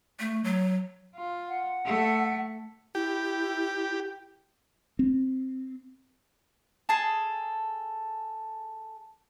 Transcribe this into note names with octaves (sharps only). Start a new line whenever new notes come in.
A3
F#3
F4
F#5
A3 A4
E4 G4
C4
G#4 A4 A5